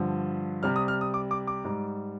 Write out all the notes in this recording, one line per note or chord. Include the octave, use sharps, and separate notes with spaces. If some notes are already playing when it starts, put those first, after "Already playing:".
Already playing: G2 D3 F3
C3 G3 F6
D#6
F6
D#6
D6
D6
D6
G#2 G3